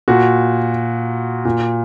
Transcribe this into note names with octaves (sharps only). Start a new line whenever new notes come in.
A#2 F#4
A#2